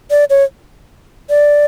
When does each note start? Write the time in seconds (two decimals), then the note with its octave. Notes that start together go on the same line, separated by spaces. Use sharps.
0.11 D5
0.30 C#5
1.30 D5